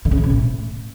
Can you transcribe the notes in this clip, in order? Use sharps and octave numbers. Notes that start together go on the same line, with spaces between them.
D3
C#3
A2
C3
A2